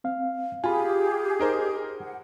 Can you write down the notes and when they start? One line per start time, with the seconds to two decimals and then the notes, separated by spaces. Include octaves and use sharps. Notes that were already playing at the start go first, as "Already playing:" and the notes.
0.04 C4 F5
0.64 F4 G4 G#4 G#5 B5
1.39 D#4 A#4 C5
1.97 F#5